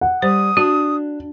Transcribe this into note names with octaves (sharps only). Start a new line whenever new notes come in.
F#5
G3 C5 D#6
D4 F#4